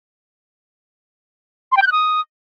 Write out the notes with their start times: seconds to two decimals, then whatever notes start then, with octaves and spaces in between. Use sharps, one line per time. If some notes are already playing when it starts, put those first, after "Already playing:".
1.72 C6
1.77 G5
1.82 G6
1.87 F#6
1.92 D#6